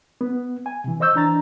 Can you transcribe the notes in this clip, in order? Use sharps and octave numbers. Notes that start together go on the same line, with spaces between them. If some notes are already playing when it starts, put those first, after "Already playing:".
B3
G#5
C3 E3
C5 D#5 C#6 E6 G6
E3 D4 A#5 A6